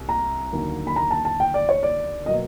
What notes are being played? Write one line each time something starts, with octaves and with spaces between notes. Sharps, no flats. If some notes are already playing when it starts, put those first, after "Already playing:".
Already playing: C2
A#5
D#2 D3 F#3 A#3 D#4
B5
A#5
A5
A5
G5
D5
C#5
D5
B2 F#3 A#3 D#5